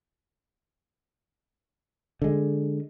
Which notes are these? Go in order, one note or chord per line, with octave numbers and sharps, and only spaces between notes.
D3 G#3